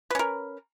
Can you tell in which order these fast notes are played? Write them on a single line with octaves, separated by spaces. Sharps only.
B4 C#4 A#4